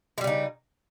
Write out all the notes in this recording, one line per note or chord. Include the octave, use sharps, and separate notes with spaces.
C#3 G3 G#3 D#4